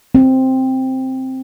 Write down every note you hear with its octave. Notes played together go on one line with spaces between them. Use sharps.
C4